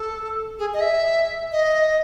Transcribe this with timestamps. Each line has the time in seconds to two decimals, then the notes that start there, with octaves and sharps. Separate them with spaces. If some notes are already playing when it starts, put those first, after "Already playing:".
Already playing: A4
0.59 G#4
0.74 D#5
0.80 E5
1.52 D#5